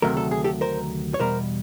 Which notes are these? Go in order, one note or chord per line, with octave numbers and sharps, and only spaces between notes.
D2 C3 D#3 F#3 A3 A#4
A4
G#4
G4 A4
A#4 C5
C#5
E2 B2 G3 A#4 C5